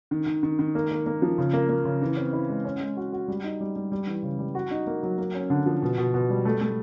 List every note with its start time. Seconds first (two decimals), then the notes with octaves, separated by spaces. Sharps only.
0.11 D#3
0.26 D#3
0.43 D#3
0.59 D#3
0.75 A#3
0.91 A#3
1.06 A#3
1.22 F3
1.38 C#3
1.53 A#3
1.69 A#3
1.85 C#3
2.02 E3
2.17 C4
2.33 E4
2.49 G#3
2.65 C#4
2.80 G#3
2.97 F#4
3.13 F#4
3.28 G3
3.43 D#4
3.60 G3
3.76 G3
3.92 G3
4.07 E3
4.23 C#3
4.39 G3
4.55 F#4
4.71 D#4
4.87 A#3
5.03 F#3
5.18 A#3
5.34 C#4
5.50 D3
5.66 F3
5.82 B2
5.98 B2
6.14 B2
6.30 G3
6.45 A3
6.61 A3